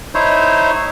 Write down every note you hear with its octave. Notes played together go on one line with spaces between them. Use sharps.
D#4 E4 C5 C#5